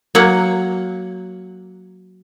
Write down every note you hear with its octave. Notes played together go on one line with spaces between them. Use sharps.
F#3 A#3 F#5